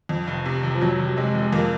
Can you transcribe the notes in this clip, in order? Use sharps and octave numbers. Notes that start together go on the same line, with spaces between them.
F2
F1
C3
F1
F3
F2 F#3
F1
F#3
C3 G#3
F1
G#3
F2 A#3